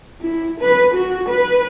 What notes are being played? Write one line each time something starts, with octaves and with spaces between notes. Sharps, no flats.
E4
B4
F#4
B4